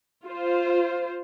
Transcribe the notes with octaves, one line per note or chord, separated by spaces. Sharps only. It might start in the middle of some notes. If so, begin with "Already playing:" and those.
F4 C5